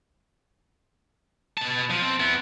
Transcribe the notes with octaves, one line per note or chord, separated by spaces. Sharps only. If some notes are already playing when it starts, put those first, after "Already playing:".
B2 A5
F3
C4
B3 E4